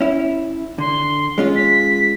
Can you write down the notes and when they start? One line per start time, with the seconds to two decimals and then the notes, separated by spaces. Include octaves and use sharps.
0.01 C#4 E4
0.78 D3 C6
1.38 G#3 C#4 F4
1.56 B6